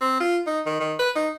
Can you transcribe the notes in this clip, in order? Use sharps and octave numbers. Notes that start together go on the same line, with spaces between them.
C4
F4
D#4
D#3
D#3
B4
D#4